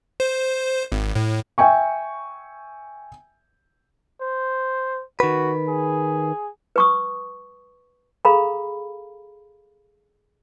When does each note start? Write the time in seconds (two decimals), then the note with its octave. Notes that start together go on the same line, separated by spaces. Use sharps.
0.20 C5
0.92 G#1
1.15 A2
1.58 E5 G5 G#5 C#6
4.21 C5
5.20 D#3 F#4 B4
5.68 G#4
6.76 B4 C#6 D#6
8.25 G#4 A4 F5 A#5 B5